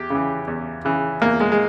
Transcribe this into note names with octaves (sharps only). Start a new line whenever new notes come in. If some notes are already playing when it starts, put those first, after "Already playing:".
Already playing: E2 G4
C#3 E3
E2
C#3 E3
E2 A#3
G#3
G#3